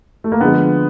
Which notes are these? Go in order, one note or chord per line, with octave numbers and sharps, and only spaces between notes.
A3
A#3
D3 F3 G#3 B3